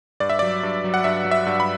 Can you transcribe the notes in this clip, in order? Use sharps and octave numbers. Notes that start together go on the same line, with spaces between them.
G2 D5
E5
F#3 D5
G2
F#3
F#5
G2 E5
F#3
E5
G2
B5